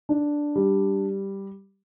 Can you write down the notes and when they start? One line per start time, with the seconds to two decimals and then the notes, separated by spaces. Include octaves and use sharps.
0.09 D4
0.56 G3